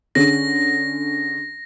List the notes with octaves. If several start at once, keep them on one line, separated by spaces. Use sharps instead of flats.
D3 C#4 G#4 A#6